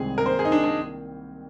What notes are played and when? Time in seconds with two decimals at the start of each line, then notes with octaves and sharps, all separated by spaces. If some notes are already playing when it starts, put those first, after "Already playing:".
Already playing: C2 C3 D#3 G#3 C4 G#4
0.18 A#4
0.25 C3 D#3 A#3 C5
0.39 G#4
0.45 D#4
0.52 D4
0.64 D4